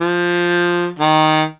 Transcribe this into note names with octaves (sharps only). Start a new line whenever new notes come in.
F3
D#3